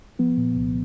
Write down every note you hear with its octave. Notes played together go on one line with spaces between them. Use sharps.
F3 B3
A#2
C2